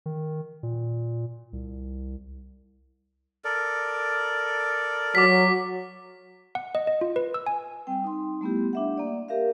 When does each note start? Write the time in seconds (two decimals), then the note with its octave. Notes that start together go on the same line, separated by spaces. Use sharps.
0.06 D#3
0.63 A#2
1.53 C2
3.44 A4 A#4 D5
5.15 F#3 D6 B6
6.55 F#5
6.75 D#5
6.87 D#5
7.01 F4
7.16 B4
7.34 E6
7.46 G#5
7.87 G3 C4 G5
8.04 D#4 C6
8.41 G3 A3 B3 E4 G4
8.73 D4 E5 F#5
8.97 A#3 D5
9.28 G4 A#4 E5 F5